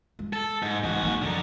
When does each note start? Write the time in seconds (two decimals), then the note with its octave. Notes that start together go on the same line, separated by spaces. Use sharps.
0.19 G#3
0.33 A4
0.63 G#2
0.84 C#2 G#2 E3 F#4
1.02 F#3 A#3
1.22 F#1 D3 F3 D#4